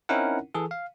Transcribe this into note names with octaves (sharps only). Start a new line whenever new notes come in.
C4 C#4 D#4 E4 A#4 F#5
E3 G#4 A4
F5